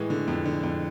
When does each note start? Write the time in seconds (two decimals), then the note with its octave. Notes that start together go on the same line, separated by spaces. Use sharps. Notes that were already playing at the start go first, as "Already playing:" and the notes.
Already playing: A2 E3 G#3
0.10 D3
0.28 F2
0.46 D3
0.63 F2